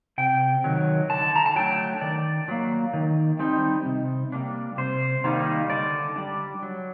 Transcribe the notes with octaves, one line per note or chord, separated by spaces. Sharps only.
C3 G5
D#3 F#3
D3 A5
A#5
A5
F#3 A3 D4 G5
D#3 D5
F#3 A#3
D#3
G3 C4 D#4
C3
G3 A#3 D4
C3 C5
D#3 G3 A#3 D#4
D3 D5
G3 D4
F#3